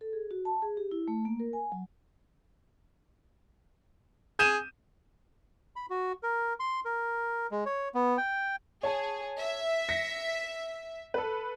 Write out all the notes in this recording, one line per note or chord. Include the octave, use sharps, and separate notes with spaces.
A4
G#4
F#4
A5
G#4
G4
E4
A3
A#3
A#4
G#5
F#3
G#4 G6 D#7 E7
B5
F#4
A#4
C6
A#4
G#3
C#5
B3
G5
G#4 C#5 A5
E5
A#6 B6 C#7
A4 B4